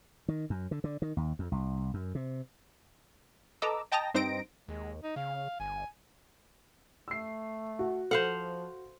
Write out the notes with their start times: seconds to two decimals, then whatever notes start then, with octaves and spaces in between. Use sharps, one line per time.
0.28 D#3
0.50 F#2
0.71 D3
0.84 D3
1.02 D#3
1.17 D#2
1.39 F2
1.52 C2
1.94 F#2
2.15 C3
3.62 A4 B4 D#5 A#5 D6 E6
3.92 D#5 G5 A5 A#5 D#6 A#6
4.14 G2 C4 D#4 C5 A#6 D7
4.69 D#2 G#3
5.03 D#4
5.16 C#3 F5
5.60 G1 G#5
7.08 A3 E6 C7
7.79 F#4
8.11 F3 A4 C5 F5 F#5